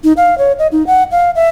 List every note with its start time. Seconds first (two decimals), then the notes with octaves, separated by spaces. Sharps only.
0.04 D#4
0.17 F5
0.38 C#5
0.59 D#5
0.72 D#4
0.87 F#5
1.11 F5
1.35 E5